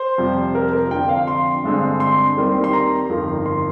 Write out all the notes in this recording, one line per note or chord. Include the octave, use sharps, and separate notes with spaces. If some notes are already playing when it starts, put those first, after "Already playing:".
Already playing: C5
F2 C3 G3 C4
A#4
A#4
F2 D3 F3 C4 G5
F5
C6
G2 D3 G#3 C4
C6
D#2 D#3 G3 C4
C6
A#5
G1 F2 D#3
C6